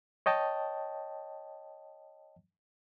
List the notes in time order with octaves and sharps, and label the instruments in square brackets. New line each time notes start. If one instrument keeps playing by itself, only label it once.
[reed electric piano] C#5 D#5 G5 A5